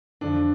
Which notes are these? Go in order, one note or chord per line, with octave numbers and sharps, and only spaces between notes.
F2 D3 F3 D4